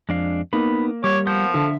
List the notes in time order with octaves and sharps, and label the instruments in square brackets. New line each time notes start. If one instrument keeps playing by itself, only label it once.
[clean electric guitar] F2 [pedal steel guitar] G#3 D4 F5
[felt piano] A#3 [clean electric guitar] B3 D#4 [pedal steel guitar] B5
[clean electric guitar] G3 [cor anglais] C#5 [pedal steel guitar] D6
[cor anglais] F3 [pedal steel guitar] B3 F#5 G6
[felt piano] D3 [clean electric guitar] A4 A5 [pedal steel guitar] E5